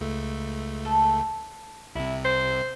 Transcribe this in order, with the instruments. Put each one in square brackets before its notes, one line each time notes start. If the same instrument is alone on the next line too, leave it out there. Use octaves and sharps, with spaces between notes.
[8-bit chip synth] C#2 A3
[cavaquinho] A4
[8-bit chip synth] C2 C3 [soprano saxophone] E4
[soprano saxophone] C5